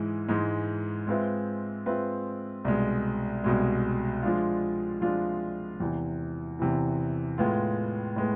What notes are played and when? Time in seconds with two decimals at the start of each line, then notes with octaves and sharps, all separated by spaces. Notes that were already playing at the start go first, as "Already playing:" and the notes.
Already playing: G#2 E3 G#3
0.28 G#2 E3 G#3
1.07 G#3 C4 F4 B4 E5
1.86 G#3 C4 F4 B4 E5
2.65 C2 B2 G#3
3.44 C2 B2 G#3
4.23 F3 G#3 D4 F4
5.01 F3 G#3 D4 F4
5.80 E2 C3 E3
6.59 E2 C3 E3
7.38 A2 G#3 B3 F4
8.16 A2 G#3 B3